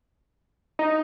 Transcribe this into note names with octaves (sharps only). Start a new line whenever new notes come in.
D#4